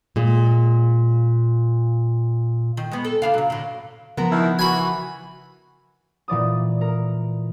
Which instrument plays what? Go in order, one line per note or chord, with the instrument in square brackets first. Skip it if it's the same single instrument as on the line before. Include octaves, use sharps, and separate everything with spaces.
[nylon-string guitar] A#2 G#3
[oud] D#3
G#3 B3
A4
C#3 D4 F5
C#3 F#3
A2 D3
[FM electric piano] C#3 F3 [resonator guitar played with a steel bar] B3 A#4
[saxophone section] B2 D#3 E4
[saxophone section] E3 F#4 [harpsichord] G#5 B5
[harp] A#2 E3 D5 D#6
A#4